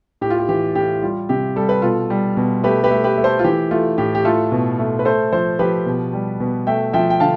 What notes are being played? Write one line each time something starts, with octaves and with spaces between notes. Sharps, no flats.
A2 G4
F4
G4
E3 G4
A2 G4
G3 F4
C3 G4
G3 A4
B4
B2 F4 A4
G3
B2
A3 G4 B4
G4 B4
A3
G4 B4
A3
A4 C5
F4
E3 G4
A3 F4
A2 G4
G4
A3 F4 A4
B2
A3
B4
A3 A4 C5
F3 A4 C5
F3 G4 B4
B2
G3
B2
A3 E5 G5
F3 E5 G5
G5
D3 F5 A5